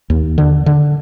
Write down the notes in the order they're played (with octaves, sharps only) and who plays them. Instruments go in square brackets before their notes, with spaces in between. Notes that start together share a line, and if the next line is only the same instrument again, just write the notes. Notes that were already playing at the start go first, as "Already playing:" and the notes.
[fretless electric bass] D#2
D3
D3